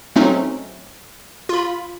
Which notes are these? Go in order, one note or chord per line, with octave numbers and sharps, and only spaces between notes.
F#3 G#3 A3 C4 C#4 D#4
F4 B5